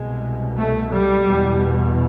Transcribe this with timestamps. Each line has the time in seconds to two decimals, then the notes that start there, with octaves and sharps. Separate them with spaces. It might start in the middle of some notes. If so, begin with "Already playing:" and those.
Already playing: C2 B2 G#3
0.57 A3
0.91 G3
1.26 E2 B2